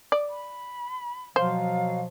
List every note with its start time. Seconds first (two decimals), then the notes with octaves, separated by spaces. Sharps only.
0.12 D5
0.29 B5
1.36 B2 F3 F#3 C5 F5